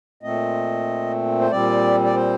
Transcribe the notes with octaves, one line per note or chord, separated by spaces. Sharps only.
A#2 A3 C4 D#5
C5
A#2 G3 C4 D5
D5
C5